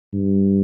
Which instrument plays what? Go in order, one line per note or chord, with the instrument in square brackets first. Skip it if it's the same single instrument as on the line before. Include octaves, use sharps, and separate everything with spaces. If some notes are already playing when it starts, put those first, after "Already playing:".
[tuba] G2